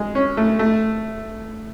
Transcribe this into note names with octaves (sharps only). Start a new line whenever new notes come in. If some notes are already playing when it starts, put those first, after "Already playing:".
Already playing: G#3
C#4
A3
A3